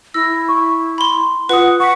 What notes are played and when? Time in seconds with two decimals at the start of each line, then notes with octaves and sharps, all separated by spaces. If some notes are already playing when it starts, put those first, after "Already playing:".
0.14 E4 E6 A#6
0.48 C#6
0.98 B5 C6
1.49 F4 B4 F#5 D#6
1.80 F#5 C#6 B6